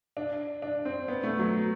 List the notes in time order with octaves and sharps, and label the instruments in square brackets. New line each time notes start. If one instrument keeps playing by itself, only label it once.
[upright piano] D4
D4
C4
B3
A3
F#3